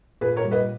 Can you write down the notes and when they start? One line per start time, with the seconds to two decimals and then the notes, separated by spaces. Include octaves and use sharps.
0.21 A#2 G#4 B4
0.36 A#4 C#5
0.45 G3
0.51 B4 D#5